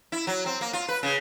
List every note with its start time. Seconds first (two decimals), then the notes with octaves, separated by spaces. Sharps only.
0.12 E4
0.27 F#3
0.46 C4
0.61 A#3
0.73 F4
0.88 B4
1.03 C#3